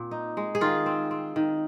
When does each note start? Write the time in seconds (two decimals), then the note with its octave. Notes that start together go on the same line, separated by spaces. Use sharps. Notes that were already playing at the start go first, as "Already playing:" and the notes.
Already playing: A#2 C4
0.11 D#4
0.37 G#3
0.55 G#4
0.61 D#3 F4
0.86 C4
1.11 C4
1.36 D#3